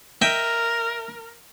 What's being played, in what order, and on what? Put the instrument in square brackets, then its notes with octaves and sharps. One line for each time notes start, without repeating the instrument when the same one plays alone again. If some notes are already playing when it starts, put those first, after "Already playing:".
[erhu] A#4 [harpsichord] D#5 E5 G5